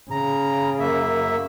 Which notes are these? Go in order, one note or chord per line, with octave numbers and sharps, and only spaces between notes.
C#3 A#5
F#2 A#3 E5